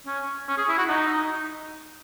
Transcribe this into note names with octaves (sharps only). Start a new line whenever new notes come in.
C#4
C#4
G#4
E4
F#4
D#4